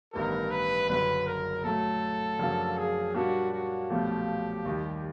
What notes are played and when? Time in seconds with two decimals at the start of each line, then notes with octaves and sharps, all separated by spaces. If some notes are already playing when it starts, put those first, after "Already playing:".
0.13 A1 G2 D#3 G3 B3 A#4
0.50 B4
0.88 F#1 F#2 D3 B4
1.26 A#4
1.64 A#2 F#3 A3 A4
2.39 F#2 C#3 F3 A#3 D4
2.77 G#4
3.14 A#2 G3 A#3 D4 F#4
3.52 F#4
3.90 B1 A#2 F3 A3 G4
4.65 D#2 D#3 G3